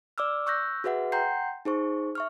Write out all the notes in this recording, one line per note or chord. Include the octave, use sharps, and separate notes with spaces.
D5 D6 E6 F6
C#6 E6 F#6 G6 A#6
F#4 G#4 B4 E5 F#5
F#5 G5 A#5 C6 G6 C7
D#4 G#4 C5 C#6
E5 C#6 F6